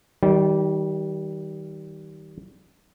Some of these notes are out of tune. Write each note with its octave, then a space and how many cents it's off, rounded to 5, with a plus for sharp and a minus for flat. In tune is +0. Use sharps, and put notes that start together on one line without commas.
D#3 +20 G3 -25